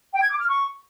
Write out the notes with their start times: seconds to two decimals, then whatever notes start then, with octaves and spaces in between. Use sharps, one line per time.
0.12 G5
0.21 G#6
0.30 D6
0.39 F6
0.48 C#6